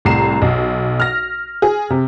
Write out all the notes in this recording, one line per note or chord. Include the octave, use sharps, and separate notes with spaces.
C2 A2 A#5 C7 E7
B1
F6 A#6
G#4
C3